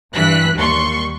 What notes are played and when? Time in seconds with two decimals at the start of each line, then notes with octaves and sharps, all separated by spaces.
0.13 G2 E3 F#6 B6
0.55 D#2 G3 C6 C#6